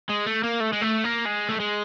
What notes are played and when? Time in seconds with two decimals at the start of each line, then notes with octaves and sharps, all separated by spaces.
0.09 G#3
0.26 A3
0.43 A#3
0.60 A3
0.73 G#3
0.82 A3
1.05 A#3
1.26 G#3
1.49 A3
1.60 G#3